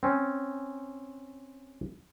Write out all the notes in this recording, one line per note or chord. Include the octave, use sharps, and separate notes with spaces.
C4 C#4